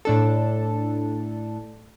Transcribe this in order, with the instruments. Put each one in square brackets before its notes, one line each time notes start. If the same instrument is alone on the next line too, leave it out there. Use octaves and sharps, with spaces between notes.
[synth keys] A2 D4 A4